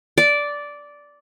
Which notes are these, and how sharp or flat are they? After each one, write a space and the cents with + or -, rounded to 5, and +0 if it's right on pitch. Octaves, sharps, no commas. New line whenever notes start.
D5 -10